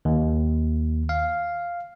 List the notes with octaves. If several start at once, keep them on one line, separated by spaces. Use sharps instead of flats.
D#2
F5